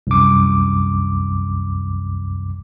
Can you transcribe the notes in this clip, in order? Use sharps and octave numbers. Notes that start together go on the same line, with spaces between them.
C2 F#2 D6